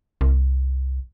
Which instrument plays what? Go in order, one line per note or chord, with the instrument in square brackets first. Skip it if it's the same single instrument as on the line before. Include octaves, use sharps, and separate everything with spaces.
[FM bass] C2